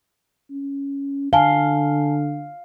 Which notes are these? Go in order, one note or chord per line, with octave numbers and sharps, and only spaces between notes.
C#4
D3 F5 G#5 A5 G7